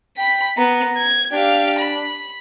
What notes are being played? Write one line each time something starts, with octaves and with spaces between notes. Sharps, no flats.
G5 B5 B6
B3 A#5
G#6
D4 G4 F5
B5